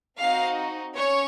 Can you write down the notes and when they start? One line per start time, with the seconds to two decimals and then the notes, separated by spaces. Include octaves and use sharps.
0.20 C4 D#4 F#4 F5
0.96 C#4 C#5